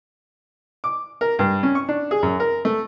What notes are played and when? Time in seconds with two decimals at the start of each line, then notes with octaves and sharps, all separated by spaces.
0.84 D6
1.21 A#4
1.39 G2
1.63 C#4
1.75 C#6
1.89 D4
2.11 G#4
2.23 F#2
2.40 A#4
2.65 A3